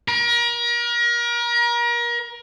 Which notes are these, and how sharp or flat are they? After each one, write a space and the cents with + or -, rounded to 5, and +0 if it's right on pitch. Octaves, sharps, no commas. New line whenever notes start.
A#4 +35